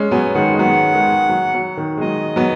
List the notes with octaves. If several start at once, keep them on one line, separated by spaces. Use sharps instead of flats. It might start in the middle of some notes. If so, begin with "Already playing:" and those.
Already playing: G#3 C#4
F#3 B3 G#5
D#3 G#3 F#5
G#3
F#3 B3 F#5
D#3 G#3
F#3
F#3
D#3
G#3
F#3 D#5
F#3 B3